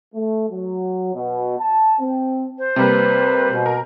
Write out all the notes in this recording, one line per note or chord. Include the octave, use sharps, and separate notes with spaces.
A3
F#3
B2
A5
C4
C5
C3 G3 A#3 B4
B2
A#4